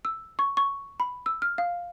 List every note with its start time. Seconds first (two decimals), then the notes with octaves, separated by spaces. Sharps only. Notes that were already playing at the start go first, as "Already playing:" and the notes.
0.05 E6
0.39 C#6
0.57 C#6
1.00 B5
1.26 E6
1.42 F6
1.58 F5